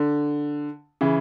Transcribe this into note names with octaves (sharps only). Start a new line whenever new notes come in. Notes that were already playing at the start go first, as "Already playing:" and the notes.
Already playing: D3
C#3 E3